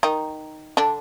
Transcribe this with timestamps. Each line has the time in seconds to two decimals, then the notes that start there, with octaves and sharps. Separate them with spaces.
0.03 D#3 D#4
0.77 D3 D4